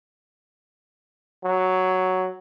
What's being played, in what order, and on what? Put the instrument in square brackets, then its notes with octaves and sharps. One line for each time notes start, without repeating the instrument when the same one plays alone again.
[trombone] F#3